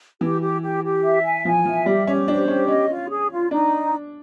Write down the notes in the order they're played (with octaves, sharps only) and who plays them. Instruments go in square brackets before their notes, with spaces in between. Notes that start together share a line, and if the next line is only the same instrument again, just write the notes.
[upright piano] E3 [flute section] G4
[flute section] G4
G4
G4
E5
G#5
[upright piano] F3 [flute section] G#5
[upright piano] F3 [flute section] E5
[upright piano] G3 [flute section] G4
[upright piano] C#4 [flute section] G4
[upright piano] D4 [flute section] C5
[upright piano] C#4 [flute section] G4
[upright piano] C#4 [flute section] D#5
[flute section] F4
G#4
F4
[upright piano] D4 [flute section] D#4